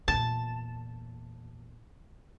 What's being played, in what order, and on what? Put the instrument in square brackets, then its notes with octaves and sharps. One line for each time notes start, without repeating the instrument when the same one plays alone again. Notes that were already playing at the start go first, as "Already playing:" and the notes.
[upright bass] E2 A#2 [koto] A5